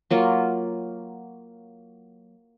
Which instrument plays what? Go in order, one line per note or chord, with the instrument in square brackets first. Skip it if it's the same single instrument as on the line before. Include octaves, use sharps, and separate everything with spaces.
[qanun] F#3 A#3 F4